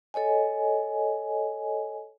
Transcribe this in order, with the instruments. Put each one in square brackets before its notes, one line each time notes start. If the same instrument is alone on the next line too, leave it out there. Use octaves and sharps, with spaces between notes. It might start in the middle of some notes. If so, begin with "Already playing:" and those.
[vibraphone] A4 C#5 D#5 G#5